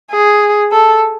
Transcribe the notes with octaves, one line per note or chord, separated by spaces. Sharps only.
G#4
A4